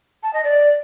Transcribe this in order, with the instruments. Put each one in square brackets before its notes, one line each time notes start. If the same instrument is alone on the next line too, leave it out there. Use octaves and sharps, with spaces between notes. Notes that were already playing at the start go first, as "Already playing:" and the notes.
[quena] A5
D#5
D5